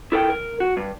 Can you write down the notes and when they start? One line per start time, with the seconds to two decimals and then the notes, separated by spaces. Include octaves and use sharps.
0.12 E4 A4 A#4 G5
0.30 A#4
0.60 F#4
0.77 G2